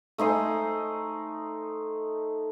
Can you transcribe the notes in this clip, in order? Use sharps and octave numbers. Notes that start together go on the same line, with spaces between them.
A3 D#4 C5 G#5